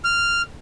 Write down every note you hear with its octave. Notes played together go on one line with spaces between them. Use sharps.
F6